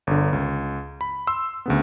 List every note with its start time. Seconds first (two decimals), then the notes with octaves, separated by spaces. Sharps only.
0.07 G1 D3
0.33 C#2
1.01 B5
1.27 C6 E6
1.66 D2 C#3 B3